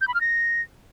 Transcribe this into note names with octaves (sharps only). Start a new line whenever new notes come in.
G6
B5
F6
A#6